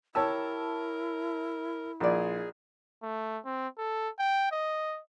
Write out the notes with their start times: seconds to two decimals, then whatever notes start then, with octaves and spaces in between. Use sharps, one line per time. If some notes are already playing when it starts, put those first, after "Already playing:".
0.15 E4 G4 A#4 C#5 A5 E6
2.00 A#1 D#4 G#4 D5
3.03 A3
3.45 C4
3.78 A4
4.19 G5
4.52 D#5